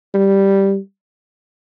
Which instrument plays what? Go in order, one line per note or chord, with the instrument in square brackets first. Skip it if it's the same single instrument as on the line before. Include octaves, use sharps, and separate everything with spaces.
[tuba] G3